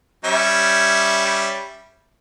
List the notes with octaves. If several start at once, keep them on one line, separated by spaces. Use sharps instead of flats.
G3 C#4 E5